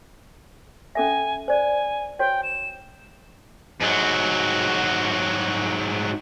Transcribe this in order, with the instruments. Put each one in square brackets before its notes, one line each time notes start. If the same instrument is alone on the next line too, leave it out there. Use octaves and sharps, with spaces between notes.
[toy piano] C#4 A4 E5 [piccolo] G#5
[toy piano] C5 D5 [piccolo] G#5
[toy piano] F#4 C5 C#5 [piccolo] G5
[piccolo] E7
[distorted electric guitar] G#2 F#3